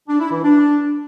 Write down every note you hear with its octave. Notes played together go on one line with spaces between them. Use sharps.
D4
E4
E3
D4